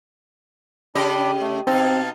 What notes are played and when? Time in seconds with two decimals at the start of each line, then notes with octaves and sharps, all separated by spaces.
0.95 C#3 D4 G4 D#5 B5 D6
1.41 A3
1.67 B2 C4 D#4 F5 A5